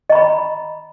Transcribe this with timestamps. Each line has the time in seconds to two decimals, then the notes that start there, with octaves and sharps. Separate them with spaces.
0.10 D#5
0.12 A#5
0.15 B5